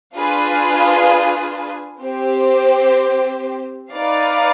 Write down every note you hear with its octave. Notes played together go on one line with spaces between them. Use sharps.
D4 F4 G#4 B4
C4 G4 C5
D#4 B4 D5 F5